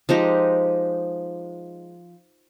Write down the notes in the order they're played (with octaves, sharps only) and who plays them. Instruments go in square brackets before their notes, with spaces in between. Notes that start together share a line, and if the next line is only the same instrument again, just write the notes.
[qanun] F3 G#3 D#4 G4